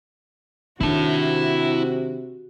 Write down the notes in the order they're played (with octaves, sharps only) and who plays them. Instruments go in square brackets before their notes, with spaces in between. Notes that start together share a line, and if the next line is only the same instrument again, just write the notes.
[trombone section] C3 [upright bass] D#3 D4 [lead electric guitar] E4 A5 [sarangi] F#4